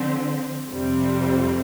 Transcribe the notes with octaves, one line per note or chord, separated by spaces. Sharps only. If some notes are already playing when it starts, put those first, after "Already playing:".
Already playing: D3 F3 C4
F2 C3 G3 C4